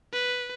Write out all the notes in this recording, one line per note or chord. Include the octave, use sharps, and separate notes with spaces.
B4